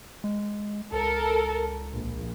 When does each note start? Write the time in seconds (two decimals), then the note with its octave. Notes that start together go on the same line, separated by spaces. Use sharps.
0.24 G#3
0.92 C#2 A4 A#4
1.93 A#1